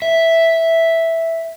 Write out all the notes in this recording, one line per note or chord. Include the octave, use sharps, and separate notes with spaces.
E5